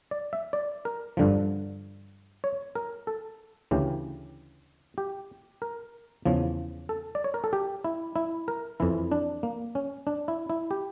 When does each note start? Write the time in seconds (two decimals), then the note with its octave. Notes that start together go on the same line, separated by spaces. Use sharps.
0.11 D5
0.33 E5
0.53 D5
0.85 A#4
1.17 G2 D3 F3
2.44 C#5
2.75 A#4
3.07 A4
3.71 D2 C#3 E3 G4
4.98 G4
5.62 A#4
6.26 E2 C#3 F3
6.89 A4
7.15 D5
7.24 C#5
7.34 A#4
7.44 A4
7.53 G4
7.84 E4
8.16 E4
8.48 A#4
8.80 F2 E3 E4
9.12 D4
9.43 A#3
9.75 C#4
10.07 D4
10.28 E4
10.50 E4
10.71 G4